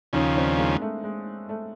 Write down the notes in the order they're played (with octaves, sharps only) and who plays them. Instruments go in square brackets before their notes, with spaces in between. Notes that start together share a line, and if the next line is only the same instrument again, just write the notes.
[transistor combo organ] D#2 C#3 F3 [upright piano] C#4 D#4
[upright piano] C4 D4
G#3 A#3
A3
G#3
A3